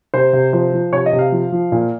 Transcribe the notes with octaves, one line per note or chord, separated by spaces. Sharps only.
C3 C5
C3
F3 C5
F3
C3 C#5
D#5
C3
F5
F3
F3
A#2